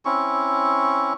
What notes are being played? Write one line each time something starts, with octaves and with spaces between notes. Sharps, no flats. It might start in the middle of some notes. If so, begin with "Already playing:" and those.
C4 C#4 E4 C#6